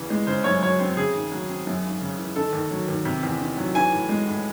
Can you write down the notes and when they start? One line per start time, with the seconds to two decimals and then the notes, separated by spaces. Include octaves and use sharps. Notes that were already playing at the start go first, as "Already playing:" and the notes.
Already playing: E2 C#3 E3
0.10 G#3
0.27 C#3 C5
0.44 F#2 C#5
0.62 F#3 C#5
0.79 C4 C5
0.97 C#3 G#4
1.14 D#2
1.32 F#3
1.49 C4
1.67 F#2
1.84 G#1
2.01 C#3
2.19 E3
2.36 D#3 A4
2.53 D#2
2.71 F#3
2.88 D#2
3.05 C3
3.23 E2
3.41 D#3
3.57 F#3
3.75 E3 G#5
3.92 A2
4.09 G#3
4.27 A2